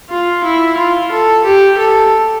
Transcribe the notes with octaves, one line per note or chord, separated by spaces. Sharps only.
F4
E4
F4
A4
G4
A4